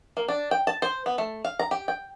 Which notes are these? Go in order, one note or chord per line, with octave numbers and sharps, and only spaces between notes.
A#3
D4
G5
A5
C5
B3
A3
F5
A#5
G4
G5